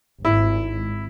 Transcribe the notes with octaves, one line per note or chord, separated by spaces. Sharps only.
G#1 E4